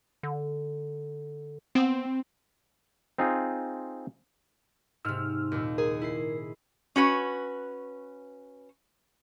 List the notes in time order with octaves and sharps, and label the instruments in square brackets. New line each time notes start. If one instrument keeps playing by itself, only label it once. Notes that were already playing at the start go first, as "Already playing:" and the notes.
[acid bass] D3
[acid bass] B3 [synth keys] C4
[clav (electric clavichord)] C4 D#4 F4 G#4
[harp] G#2 C3 [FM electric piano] E6 F6
[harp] D#2 A#2
[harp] G#4 [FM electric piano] A#4
[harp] E4 C7
[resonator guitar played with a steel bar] C#4 F#4 B4